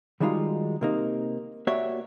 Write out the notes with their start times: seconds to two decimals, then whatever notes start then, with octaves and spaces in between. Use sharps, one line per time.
0.20 D#3 G3 G#3 D#4 F4 F#4
0.81 C3 A#3 D#4
1.67 A#3 F#4 G4 C#5 D5 E5